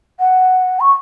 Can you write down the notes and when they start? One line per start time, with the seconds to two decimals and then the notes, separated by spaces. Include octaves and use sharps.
0.20 F#5
0.80 C#6